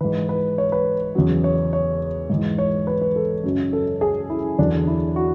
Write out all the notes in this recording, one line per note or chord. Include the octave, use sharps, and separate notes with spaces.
G#2 E3 B4
B4
C#5
B4
E2 C#3 F#3
C#5
C#5
G#2 E3
C#5
B4
B4
A4
F#2 C#3 F#3
A4
G#4
E4
E2 D3 F#3 D4
E4
F#4